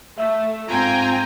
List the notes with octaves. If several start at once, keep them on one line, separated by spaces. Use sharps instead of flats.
A3 E5
G#2 C4 F4 G5 G#5 A#5